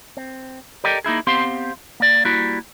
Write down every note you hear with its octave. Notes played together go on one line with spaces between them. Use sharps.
C4
G4 A4 A#4 D5 D#5 G5
A#3 D#4 E4 G#4
B3 C4 G4 C5 F5 C6
A#3 D5
G3 A#3 E4 F#4